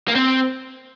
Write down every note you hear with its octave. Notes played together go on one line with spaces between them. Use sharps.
A#3
C4